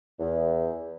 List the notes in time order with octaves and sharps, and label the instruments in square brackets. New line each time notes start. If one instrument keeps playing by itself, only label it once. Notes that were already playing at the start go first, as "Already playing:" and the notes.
[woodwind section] E2